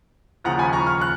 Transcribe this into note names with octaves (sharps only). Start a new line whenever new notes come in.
D#2 C#3 F3 F#5 A#5
G#5 B5
A#5 C#6
C#6 F6
F#6